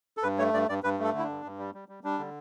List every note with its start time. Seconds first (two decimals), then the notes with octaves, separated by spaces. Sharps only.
0.17 A4
0.23 G2 B4
0.39 A3 C#5
0.54 G2 D5
0.69 G2 D5
0.83 G2 B4
0.99 A3 A4
1.13 D3
1.19 E4
1.24 D4
1.29 G2
1.44 G2
1.59 G3
1.74 G3
1.88 G3
2.04 G3 D4
2.19 D3